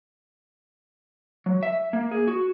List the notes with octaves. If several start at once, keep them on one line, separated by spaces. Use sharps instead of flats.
F#3
E5
A#3
G#4
F#4